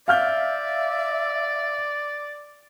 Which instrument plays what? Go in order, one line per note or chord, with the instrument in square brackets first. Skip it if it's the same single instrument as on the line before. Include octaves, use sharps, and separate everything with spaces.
[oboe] D5 [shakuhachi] E5 [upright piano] F5 F6 G6